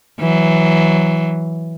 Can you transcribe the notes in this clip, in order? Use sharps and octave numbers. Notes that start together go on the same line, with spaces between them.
E3 F#3